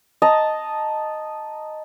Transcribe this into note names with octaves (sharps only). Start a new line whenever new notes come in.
D#5 A5 A#5